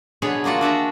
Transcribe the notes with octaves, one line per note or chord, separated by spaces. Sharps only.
B2 D3 G#4 B4 C#5
A#3 D4 F4 F#4 F#5
D4 F#4 E5 A#5